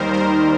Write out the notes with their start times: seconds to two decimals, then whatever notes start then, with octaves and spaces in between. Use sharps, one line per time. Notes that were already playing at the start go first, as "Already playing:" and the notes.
Already playing: D#2 D#3 G3 A#4 C5
0.13 A#4 C5